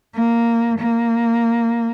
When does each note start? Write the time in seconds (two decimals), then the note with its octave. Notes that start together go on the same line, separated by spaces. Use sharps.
0.15 A#3
0.78 A#3